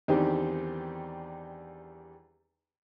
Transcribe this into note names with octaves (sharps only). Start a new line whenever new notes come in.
E2 D#3 G3 C4 D4 G4